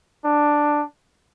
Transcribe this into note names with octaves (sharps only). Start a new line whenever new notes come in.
D4